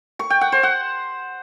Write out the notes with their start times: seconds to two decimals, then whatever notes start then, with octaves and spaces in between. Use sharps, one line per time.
0.19 C#6
0.30 G5
0.41 F#5
0.52 C5
0.63 F#5